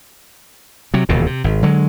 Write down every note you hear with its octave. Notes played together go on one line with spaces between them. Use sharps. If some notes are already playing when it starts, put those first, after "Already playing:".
C3 F#3
E1 D#2 A#2 C#3
C3
G#1
D3 F#3 G#3